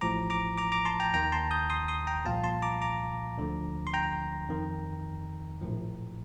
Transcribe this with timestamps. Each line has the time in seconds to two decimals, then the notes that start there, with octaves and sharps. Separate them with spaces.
0.01 A1 A2 F3 A#5 D6
0.30 A#5 D6
0.57 A#5 D6
0.72 A#5 D6
0.85 A5 C6
1.00 G5 A#5
1.14 D#2 D#3 G5 A#5
1.32 A5 C6
1.51 D#6 G6
1.70 C6 D#6
1.88 C6 D#6
2.07 G5 A#5
2.25 C2 A#2 F3 F5 A5
2.44 A5 C6
2.62 A#5 D6
2.82 A#5 D6
3.38 D2 D3 F3
3.87 C6
3.94 G5 A#5
4.49 F2 D#3
5.61 A#1 A2 F3